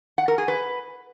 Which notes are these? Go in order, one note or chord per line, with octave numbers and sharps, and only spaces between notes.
F#5
A#4
G#4
B4